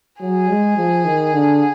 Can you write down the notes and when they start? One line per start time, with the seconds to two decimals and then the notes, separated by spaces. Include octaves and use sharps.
0.21 F#3 G#4
0.50 G#3
0.77 F3
1.05 D#3
1.33 D3